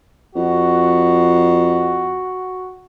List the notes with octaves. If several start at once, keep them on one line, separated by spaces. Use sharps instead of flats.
F2 F#4